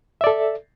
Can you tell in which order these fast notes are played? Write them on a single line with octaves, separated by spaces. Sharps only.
E5 D5 A4